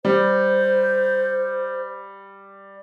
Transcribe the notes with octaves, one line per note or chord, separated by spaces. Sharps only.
G3 C5